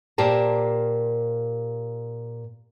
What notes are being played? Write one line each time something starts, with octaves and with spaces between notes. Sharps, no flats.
A#2 G4 A#4 C5 A5